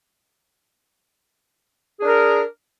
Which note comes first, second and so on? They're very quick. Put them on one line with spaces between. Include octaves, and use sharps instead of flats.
G#4 D4 A#4